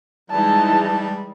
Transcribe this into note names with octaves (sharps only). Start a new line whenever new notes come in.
E3 G3 G#3 D#4 A5